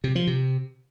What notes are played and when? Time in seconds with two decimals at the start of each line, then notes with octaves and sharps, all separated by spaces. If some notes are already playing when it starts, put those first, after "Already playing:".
0.04 C3
0.15 F3
0.27 C3